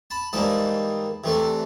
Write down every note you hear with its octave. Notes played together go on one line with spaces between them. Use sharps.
A5 B5
G#2 E3 G3 A#3 A5 B5
C3 E3 A3 D4